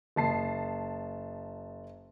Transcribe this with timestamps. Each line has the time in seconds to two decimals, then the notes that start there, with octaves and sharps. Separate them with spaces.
0.16 F#1 A5 C7